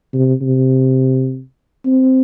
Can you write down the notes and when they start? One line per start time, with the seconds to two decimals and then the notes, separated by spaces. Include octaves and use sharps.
0.14 C3
0.41 C3
1.86 C4